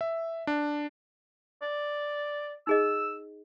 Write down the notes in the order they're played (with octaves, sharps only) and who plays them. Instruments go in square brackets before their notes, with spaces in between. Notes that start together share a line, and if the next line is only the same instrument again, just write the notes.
[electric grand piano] E5
D4
[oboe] D5
[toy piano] D#4 G#4 D#5 [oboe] E6